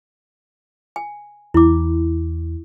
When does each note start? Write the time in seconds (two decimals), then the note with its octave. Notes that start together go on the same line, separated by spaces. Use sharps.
0.96 G#5
1.54 E2 E4 D6